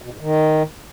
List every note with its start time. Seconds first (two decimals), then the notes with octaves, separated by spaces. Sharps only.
0.02 B2
0.11 G#2
0.21 D#3